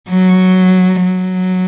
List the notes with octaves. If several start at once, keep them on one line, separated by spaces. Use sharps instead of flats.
F#3
F#3